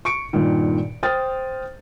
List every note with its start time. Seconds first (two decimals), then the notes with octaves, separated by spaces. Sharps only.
0.05 C#6 C#7 D7
0.33 G2 A#2 D#3
1.03 C5 G5 D#6 F6 A6